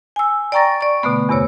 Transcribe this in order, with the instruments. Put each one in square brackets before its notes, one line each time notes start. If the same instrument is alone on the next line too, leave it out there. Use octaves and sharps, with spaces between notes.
[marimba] G#5 E6
D5 G5 A#5 C#6 A6 A#6
D5 C#6
B2 D3 A3 B3
E2 G2 C3 C#5